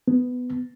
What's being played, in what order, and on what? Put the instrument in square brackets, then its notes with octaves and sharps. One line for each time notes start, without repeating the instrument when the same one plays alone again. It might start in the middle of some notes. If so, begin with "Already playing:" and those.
[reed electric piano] B3